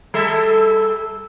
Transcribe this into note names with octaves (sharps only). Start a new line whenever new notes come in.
G3 A4 E5